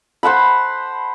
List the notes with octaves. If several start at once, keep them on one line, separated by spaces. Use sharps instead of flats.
C5 F#5 A5 B5